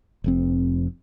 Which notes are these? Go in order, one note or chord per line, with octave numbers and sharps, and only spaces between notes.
F1 F2 C4